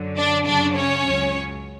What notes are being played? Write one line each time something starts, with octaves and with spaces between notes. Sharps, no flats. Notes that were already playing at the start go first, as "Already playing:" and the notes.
Already playing: F#2 D3 F#3
D4 D5
F#2 C#3 F#3 D4 D5
C#4 C#5
C#2 C#3 F#3